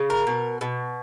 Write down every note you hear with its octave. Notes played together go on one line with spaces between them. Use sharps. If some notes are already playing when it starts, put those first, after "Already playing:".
Already playing: C#3
A#4
B2
B2